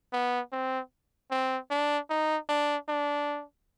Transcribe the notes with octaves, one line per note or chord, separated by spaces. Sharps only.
B3
C4
C4
D4
D#4
D4
D4